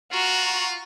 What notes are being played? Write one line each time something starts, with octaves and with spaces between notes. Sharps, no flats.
F4 F#4 A#5